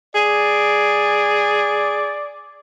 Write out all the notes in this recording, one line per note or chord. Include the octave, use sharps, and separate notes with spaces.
G#4 D5